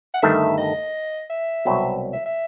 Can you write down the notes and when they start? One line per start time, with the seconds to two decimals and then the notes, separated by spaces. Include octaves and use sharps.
0.14 F#5
0.22 G1 G2 D#3 A3 E5
0.58 D#5
1.30 E5
1.65 C2 B2 F#3 C4
2.13 E5
2.26 E5